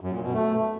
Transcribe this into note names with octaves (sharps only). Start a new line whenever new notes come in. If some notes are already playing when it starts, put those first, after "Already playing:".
F#2
A#2
B2
A3